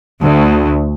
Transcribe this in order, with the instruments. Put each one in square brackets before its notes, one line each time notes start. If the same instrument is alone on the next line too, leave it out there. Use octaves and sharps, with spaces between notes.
[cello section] D2